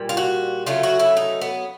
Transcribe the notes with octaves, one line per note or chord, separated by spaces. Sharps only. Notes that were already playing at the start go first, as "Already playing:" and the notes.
Already playing: A#2 G3
F4
F#4
C#3 F#3 A3 F4
F#4
E4
D#4
B3